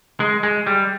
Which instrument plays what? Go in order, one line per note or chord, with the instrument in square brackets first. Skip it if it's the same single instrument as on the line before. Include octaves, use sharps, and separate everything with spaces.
[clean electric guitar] G#3
G#3
G3